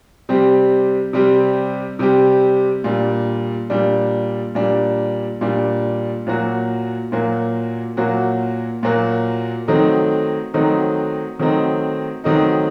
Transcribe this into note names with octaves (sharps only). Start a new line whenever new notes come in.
C3 G3 C4 G4
C3 G3 C4 G4
C3 G3 C4 G4
A#2 G3 D4
A#2 G3 D4
A#2 G3 D4
A#2 G3 D4
A#2 F#3 A#3 F#4
A#2 F#3 A#3 F#4
A#2 F#3 A#3 F#4
A#2 F#3 A#3 F#4
D#3 F#3 A3 C4 D#4
D#3 F#3 A3 C4 D#4
D#3 F#3 A3 C4 D#4
D#3 F#3 A3 C4 D#4